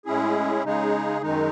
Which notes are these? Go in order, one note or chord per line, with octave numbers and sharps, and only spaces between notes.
A2 G#3 C#4 E4 G#4
C#3 G#3 D#4 G#4
F#2 D#3 G#3 D#4